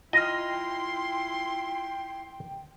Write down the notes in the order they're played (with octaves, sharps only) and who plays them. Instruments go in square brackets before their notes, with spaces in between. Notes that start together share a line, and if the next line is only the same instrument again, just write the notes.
[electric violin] E4 C6 [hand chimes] F4 F6 [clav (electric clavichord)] D#5 [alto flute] G5